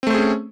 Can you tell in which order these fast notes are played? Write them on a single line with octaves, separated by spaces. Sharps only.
C4 A3 C5 G#4 C#4